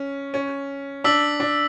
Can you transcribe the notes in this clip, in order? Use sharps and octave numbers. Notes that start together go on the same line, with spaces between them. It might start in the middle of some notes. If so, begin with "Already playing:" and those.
Already playing: C#4
C#4
D4 E6 B6 F#7
D4